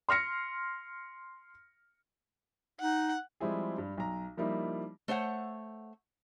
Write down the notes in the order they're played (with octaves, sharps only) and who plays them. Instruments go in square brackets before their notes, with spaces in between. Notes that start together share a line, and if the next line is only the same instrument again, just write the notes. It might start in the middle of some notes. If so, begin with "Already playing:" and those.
[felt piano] C6 F6 A#6 C#7
[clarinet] D#4 [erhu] F#5
[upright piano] F3 G3 G#3 C4 E4 G#4
G2
B1 A#5
F3 G3 A#3 D#4 E4
[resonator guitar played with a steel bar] A3 C5 C#5 F#5